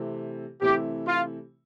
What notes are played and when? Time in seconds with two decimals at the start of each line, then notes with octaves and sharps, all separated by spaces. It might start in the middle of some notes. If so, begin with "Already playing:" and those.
Already playing: C3 E3 A3 C4 E4
0.61 C3 E3 A3 C4 E4 G4
1.08 F4